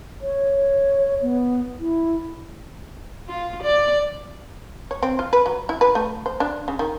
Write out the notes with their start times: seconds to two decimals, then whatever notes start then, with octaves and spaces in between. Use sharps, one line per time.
0.22 C#5
1.21 B3
1.79 E4
3.28 F4
3.63 D5
4.91 C#5
5.03 C4
5.19 F4
5.33 B4
5.46 F#3
5.69 E4
5.81 B4
5.95 A3
6.26 C5
6.40 D4
6.68 C#3
6.79 D#3